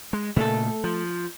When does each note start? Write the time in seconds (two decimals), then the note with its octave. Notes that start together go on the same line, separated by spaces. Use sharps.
0.13 G#3
0.36 A#2 C#3 A3 A4
0.84 F3